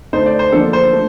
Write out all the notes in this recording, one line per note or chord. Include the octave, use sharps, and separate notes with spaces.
D3 A3 D#4 C5
D5
C5
D3 F3 A#3 D4 A4
C5
A3